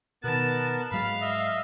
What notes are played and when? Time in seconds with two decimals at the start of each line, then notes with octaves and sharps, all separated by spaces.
0.24 B2 D#3 B3 A#4 A5 F#6
0.91 G#2 F#3 G#3 F5 B5
1.21 D#5 E5